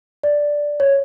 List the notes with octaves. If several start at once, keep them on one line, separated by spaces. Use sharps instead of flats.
D5
C#5